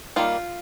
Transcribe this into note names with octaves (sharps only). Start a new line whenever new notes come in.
D#3 G3 A#3 F4